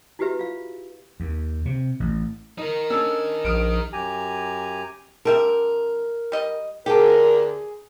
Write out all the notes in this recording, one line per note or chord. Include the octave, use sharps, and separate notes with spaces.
E4 F#4 G4 B4 E5
F4 F5
D#2
C3
A1
D#4 A#4
C#4 D4 A4 E6
A#1 D#6 F6 D7
F#2 G4 G#5 A#5
D3 G3 A#4 E5
G3 D#5
D2 D3 D4 G4 G#4 A#4